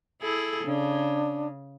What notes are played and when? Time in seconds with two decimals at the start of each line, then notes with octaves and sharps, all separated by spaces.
0.22 E4 G#4 A4
0.64 C#3 D4